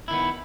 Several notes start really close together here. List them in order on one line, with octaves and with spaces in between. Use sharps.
E4 D#3 B3